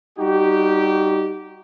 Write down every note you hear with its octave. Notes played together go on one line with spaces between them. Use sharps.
G3 D#4 F#4 G4